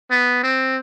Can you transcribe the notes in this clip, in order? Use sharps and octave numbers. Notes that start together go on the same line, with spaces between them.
B3
C4